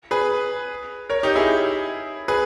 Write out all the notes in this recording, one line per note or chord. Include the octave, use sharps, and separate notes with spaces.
G#4 B4
A#4 C#5
D#4 G4
E4 G#4
G#4 B4